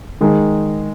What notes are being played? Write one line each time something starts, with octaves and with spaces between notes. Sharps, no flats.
D#3 G#3 D#4